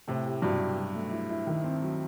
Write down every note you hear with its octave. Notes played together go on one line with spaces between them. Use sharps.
A2 C3 E4
G4
G2 B2 F#3
G4
F#3
A3
E4
E4
D#3
C4
F#3